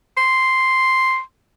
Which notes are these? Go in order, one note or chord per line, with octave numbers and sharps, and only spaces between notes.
C6